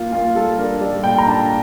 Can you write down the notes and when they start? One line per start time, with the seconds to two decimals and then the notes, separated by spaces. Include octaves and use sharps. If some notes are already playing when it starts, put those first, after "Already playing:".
Already playing: A#3 F4
0.12 A#3 F4
0.35 G3 A4
0.58 D4 A#4
0.81 G3 D5
1.04 A#2 G5
1.18 A#5
1.27 D4 A5